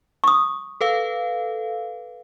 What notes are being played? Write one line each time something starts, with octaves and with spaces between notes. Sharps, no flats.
C#6 D#6
A4 B4 F5